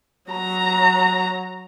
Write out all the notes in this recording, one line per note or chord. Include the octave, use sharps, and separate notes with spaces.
F#3 A#5